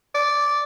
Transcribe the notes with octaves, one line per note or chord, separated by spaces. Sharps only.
D5